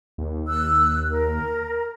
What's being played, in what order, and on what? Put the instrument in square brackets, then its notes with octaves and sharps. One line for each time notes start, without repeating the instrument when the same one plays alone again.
[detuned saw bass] D#2
[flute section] E6 F#6
A#4